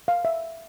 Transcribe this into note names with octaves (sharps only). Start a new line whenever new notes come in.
F5
E5